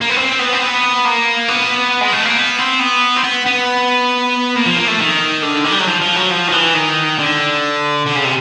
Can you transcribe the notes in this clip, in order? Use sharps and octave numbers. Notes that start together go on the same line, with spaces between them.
A#3
B3
C4
B3
C4
B3
A#3
B3
G#3
A3
A#3
B3
C4
B3
C4
B3
B3
A#3
F3
A#3
A3
D#3
D3
D#3
G3
F#3
F3
F3
F#3
F3
D#3
E3
D#3
D3
D3
C#3
C3